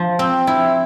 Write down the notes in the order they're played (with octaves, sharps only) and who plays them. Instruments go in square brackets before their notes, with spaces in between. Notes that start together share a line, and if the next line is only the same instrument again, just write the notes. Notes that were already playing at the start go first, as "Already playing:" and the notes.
Already playing: [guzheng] F3
C4
E4